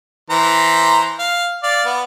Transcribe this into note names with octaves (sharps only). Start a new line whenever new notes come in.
E3 C5 A#5
F5
D5 F5
B3